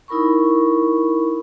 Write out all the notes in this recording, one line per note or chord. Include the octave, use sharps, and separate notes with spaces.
D#4 E4 A#4 B5 C#6